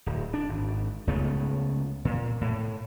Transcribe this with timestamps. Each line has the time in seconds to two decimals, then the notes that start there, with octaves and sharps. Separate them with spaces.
0.06 D1
0.34 D4
0.49 G#1
1.07 C#2 C#3 A3 B3
2.05 A#2
2.41 A2